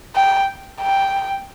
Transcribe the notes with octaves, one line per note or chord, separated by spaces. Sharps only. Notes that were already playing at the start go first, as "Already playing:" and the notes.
G5
G5